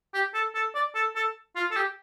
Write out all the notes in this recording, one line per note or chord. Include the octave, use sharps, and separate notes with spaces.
G4
A4
A4
D5
A4
A4
F4
A4
G4